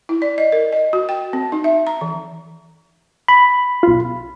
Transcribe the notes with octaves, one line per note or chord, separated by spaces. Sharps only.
E4
D5
D#5
A#4
D#5
F#4
G5
C4
D#4
E5
A#5
E3
B5
B1 F4